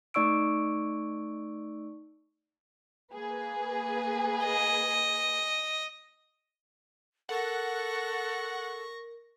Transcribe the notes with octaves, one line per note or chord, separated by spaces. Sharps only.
A3 D#4 D5 C#6 E6 D7
A#3 G#4 B4
D#5
A4 A#4 F#5 C#6 A#6